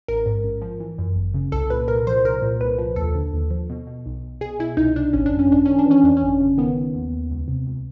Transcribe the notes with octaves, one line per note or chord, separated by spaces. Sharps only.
A1 A#4
G#2
A1
F3
E3
F#2
G1
C#3
C2 A4
A#2 B4
C2 A#4
F3 C5
C2 A#4
A#2
C2 B4
F3
D#2 A4
D3
D#2
F3
B2
B2
B1
B1
B2 G#4
B2 E4
C2 D#4
C2 D4
G#1 C#4
D4
F#2
C#4
G#1 D4
D#3 C#4
D4
E3
C#4
F2 D4
C#4
G1
C#3
D#3 B3
D#3
D#2
D#2
C#2
C3
C#2